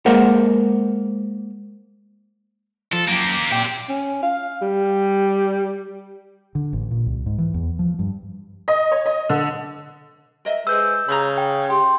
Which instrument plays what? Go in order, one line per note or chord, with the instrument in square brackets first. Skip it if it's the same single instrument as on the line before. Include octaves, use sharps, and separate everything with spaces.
[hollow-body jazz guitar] G#3 A#3 A#4 C5 F#5
[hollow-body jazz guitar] F3 [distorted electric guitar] A4
[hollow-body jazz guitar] F#2 [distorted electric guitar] A#3 G4
[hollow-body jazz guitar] A#2 G5 [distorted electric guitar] C4 G4
[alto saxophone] C#4
F5
G3
[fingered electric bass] D3
A1
A#2
C2
G#2
E3
E2
F3
G2
[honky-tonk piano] D#5
C#5
D#5
D3
[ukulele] A#4 D#5 E5
[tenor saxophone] G#3 [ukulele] B4 C5 [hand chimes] E6 G6
[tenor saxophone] C#3 [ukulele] A#5 B5
[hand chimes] G5
[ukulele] G4 [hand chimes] G5 [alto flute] C6